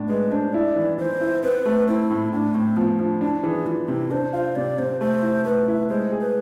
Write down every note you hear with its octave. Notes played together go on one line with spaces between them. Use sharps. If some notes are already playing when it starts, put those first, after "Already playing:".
Already playing: A2 D4
G#3 B4
D4 C5
E4 D5
E3
E3 C5
E4
C4 B4
A3
C4 E4
A2
A2 D4
A2 C4
F3 B3
F3 D4
D4 E4
E3 G#4
E3 F4
C3 E4
D4 C5
F4 C5
C3 D5
C3 C5
A3 C5
E4
A3 B4
E4
G#3 C5
G#4
B4